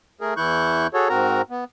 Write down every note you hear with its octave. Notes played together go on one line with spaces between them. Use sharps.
A3 G#4 A#4
E2 E3 E4 C#6 F#6 G6
F#4 G#4 A4 C#5
G#2 C4 F#4 A#4 A#5
B3